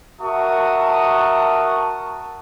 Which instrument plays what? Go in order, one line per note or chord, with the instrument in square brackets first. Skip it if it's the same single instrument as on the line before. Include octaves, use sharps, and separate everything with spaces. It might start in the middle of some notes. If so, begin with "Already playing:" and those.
[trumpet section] F#4 A#4 E5 A5 C#6 D#6